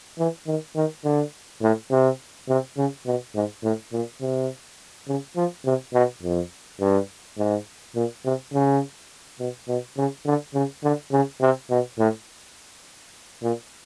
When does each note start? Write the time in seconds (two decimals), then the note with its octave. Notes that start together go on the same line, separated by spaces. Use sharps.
0.18 E3
0.47 D#3
0.76 D#3
1.04 D3
1.62 A2
1.91 C3
2.49 C3
2.77 C#3
3.06 B2
3.35 G#2
3.63 A2
3.92 A#2
4.21 C3
5.07 C#3
5.36 F3
5.65 C3
5.94 B2
6.22 F2
6.80 G2
7.37 G#2
7.95 A#2
8.25 C3
8.53 C#3
9.39 B2
9.68 B2
9.97 C#3
10.26 D3
10.54 C#3
10.83 D3
11.12 C#3
11.41 C3
11.70 B2
11.99 A2
13.42 A#2